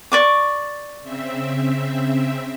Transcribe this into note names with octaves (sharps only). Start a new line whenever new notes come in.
D5 C#6 D6
C#3 C4 E5